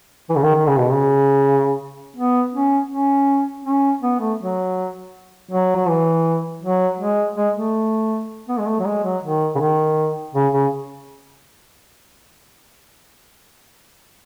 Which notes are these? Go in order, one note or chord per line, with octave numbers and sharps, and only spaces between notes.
E3
C#3
D#3
D#3
C#3
B2
C#3
B3
C#4
C#4
C#4
B3
A3
F#3
F#3
F#3
E3
F#3
G#3
G#3
A3
B3
G#3
A3
F#3
G#3
F#3
D#3
C#3
D#3
C#3
C#3